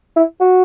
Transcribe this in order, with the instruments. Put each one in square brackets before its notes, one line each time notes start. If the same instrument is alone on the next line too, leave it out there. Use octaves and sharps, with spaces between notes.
[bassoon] E4
F#4